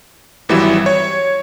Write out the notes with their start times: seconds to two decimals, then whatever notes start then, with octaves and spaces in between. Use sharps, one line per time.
0.49 G#1 E3 F#3 G3 E5 E7
0.86 C#5